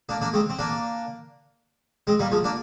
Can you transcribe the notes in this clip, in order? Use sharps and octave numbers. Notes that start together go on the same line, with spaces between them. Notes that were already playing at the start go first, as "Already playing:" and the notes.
A#3 D4
A#3 D4
G#3 C4
C4
A#3 D4
G#3 C4
G3 A#3
F3 G#3
A#3 D4